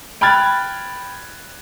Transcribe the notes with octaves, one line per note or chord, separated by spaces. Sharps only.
G5 B5 F6 F#6 G#6 A6